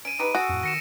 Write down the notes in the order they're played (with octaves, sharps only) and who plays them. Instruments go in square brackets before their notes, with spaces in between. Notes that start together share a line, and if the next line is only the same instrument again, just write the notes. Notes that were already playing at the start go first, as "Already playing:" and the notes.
[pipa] C#4 [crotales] D7 D#7
[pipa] D#4 G4 B4 [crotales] D#7
[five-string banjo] F#4 [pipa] G#4 A4
[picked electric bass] F2 A2
[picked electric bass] D#3 [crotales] A#6 C#7 E7